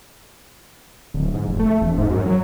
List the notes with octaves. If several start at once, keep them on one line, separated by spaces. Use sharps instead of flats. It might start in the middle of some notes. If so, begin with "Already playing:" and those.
D1
G#2
F1
A3
E1
G#2
F#2
F#3